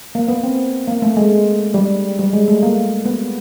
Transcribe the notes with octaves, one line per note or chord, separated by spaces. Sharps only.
A#3
B3
C4
A#3
A3
G#3
G3
G3
G#3
A3
A#3
B3